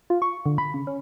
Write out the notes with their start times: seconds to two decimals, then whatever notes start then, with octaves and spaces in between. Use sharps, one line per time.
0.10 F4
0.22 C#6
0.46 D3
0.58 B5
0.74 C#3
0.87 C#4